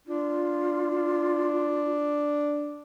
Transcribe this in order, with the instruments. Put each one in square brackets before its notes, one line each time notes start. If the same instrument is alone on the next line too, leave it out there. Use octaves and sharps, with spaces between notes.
[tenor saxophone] D4 [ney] F4